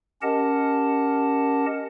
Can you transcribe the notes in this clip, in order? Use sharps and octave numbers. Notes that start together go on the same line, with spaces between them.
C#4 G4 A#4 D#5 F#5 A5